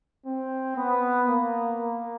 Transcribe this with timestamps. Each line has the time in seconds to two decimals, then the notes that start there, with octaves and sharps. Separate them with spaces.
0.26 C4
0.76 B3
1.28 A#3
1.80 A#3